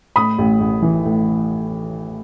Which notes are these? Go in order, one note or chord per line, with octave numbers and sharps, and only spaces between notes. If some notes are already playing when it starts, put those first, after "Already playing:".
A2 B5 D#6
A1
A1
E3
A2